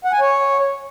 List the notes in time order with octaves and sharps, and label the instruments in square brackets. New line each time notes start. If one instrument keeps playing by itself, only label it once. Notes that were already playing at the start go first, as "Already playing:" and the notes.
[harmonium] F#5
G#5
C#5